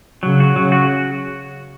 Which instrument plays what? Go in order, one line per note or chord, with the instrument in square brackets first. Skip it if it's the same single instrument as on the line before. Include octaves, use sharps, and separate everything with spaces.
[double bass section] C#3 [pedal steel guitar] F#3
[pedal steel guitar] F#4
[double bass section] C#3 [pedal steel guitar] F#3
[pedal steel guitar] F#4